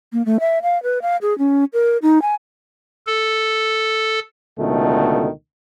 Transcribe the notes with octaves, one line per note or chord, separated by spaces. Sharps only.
A#3
A3
E5
F5
B4
F5
G#4
C#4
A#4
D#4
G#5
A4
C#2 B2 D3 D#3 A3